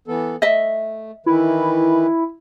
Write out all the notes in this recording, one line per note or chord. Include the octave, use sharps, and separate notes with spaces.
E3 B3 A4
A3 D#5 E5
D#3 E3 E4 B4